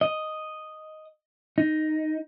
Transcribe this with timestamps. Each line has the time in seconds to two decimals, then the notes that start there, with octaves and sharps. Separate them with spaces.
0.01 D#5
1.58 D#4